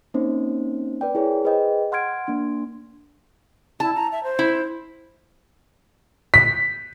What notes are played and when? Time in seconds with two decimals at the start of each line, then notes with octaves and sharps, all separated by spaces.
0.14 A#3 C4 C#4 D#4 C5
1.01 B4 D5 G5
1.15 E4 G#4 A#4 C#5
1.44 G#4 B4 C5 D#5 G5
1.92 F#5 C6 F6 G#6 D7
2.27 A#3 D4 C6
3.80 E4 A5
3.95 A#5
4.12 E5
4.24 C5
4.39 E4
6.34 B6